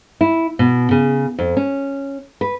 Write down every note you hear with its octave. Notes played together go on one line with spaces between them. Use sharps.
E4
B2
C#3
F2
C#4
B4